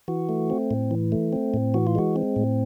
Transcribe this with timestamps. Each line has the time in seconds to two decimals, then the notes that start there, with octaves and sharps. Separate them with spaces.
0.08 E3 F#4
0.29 A3
0.50 C4
0.71 A2
0.91 E3
1.12 A3
1.33 C4
1.54 A2
1.74 E3 F#4
1.87 F4
1.95 G#3 F#4
2.16 C4
2.36 A2